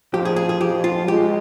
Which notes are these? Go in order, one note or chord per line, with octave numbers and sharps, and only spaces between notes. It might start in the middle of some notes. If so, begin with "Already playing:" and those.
F3 G4
G#4
G#4
G#4
F3 G4
F4
G#3 G4